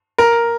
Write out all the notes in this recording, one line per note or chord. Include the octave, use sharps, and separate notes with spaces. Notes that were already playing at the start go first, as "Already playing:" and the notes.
A#4